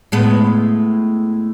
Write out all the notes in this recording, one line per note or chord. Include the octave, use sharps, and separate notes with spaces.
A2 G#3 B3